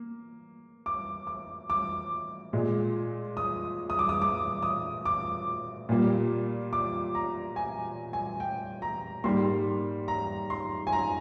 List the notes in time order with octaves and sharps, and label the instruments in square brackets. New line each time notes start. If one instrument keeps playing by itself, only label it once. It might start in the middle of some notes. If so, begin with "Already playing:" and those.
Already playing: [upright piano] A#3
D6
D6
D6
A#2 G#3
D#6
D#6
D6
D#6
D6
D#6
D6
A#2 G3 A#3
D6
A#5
G#5
G#5
G5
A#5
G#2 G3 A#3 C6
A#5
C6
G#5
A#5